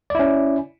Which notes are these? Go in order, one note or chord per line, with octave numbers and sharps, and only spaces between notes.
C#4 E4 D5